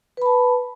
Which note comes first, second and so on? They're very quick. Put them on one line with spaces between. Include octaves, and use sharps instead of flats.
B4 B5 A5